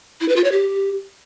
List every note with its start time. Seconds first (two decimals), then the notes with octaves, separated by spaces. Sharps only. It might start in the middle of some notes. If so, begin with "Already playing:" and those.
0.21 E4
0.28 B4
0.36 F4
0.44 C#5
0.52 G4